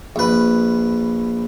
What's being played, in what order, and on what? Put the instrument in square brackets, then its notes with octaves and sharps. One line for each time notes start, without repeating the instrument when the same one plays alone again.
[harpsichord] A#1 B4